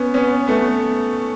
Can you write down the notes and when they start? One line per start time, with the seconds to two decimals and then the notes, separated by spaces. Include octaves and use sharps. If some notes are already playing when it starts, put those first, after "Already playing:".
Already playing: B3 C#4
0.14 B3 C#4
0.48 A3 B3